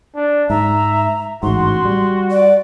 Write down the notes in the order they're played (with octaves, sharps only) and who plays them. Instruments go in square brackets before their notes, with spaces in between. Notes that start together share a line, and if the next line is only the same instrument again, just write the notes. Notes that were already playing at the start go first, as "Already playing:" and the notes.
[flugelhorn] D4
[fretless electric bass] G#2 [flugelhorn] E5 [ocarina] A#5
[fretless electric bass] A1 G#2 [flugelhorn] F#4 [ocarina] C6
[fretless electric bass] G3
[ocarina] D5